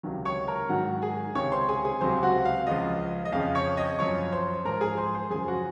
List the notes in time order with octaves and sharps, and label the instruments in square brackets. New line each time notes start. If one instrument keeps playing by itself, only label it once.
[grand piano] C#2 C3 D#3 F#3
C#5 C#6
A#4 A#5
G#2 D#3 F#3 F#4 F#5
G#4 G#5
C#2 C3 D#3 C#5 C#6
C5 C6
G#4 G#5
G#4 G#5
C#2 C3 F#3 C5 C6
F#4 F#5
F5
C#2 C#3 F3 D#5
D#5
F2 C#3 F3 F5
C#5 C#6
D#5 D#6
F#2 F3 C#5 C#6
C5 C6
G#2 F3 A#4 A#5
G#4 G#5
C5 C6
C5 C6
F#2 C#3 F3 G#4 G#5
F#4 F#5